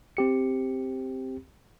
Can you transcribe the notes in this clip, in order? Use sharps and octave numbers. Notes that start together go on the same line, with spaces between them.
C4 G4 C#7